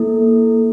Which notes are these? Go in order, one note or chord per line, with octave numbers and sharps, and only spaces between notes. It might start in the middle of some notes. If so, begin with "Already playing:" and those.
Already playing: A#3 E4 A4